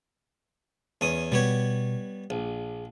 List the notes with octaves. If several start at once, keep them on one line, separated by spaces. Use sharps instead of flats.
E2 C#4 D#6
B2 G3 B3 C#5
A#1 G#4